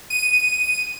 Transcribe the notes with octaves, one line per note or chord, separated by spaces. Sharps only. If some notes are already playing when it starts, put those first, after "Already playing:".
D#7